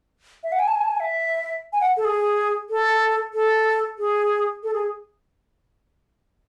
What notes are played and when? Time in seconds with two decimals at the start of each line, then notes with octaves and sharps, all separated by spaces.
0.43 E5
0.52 F#5
0.59 G#5
0.67 A5
0.75 G#5
0.84 A5
0.91 G#5
1.00 E5
1.73 G#5
1.80 F#5
1.97 A4
2.05 G#4
2.70 A4
3.34 A4
3.98 G#4
4.63 A4
4.73 G#4